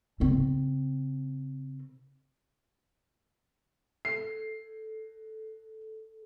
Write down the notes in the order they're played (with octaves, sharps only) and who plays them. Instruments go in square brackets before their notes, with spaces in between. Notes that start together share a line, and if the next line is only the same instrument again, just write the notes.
[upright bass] C#3 C4
[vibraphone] A4 [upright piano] C7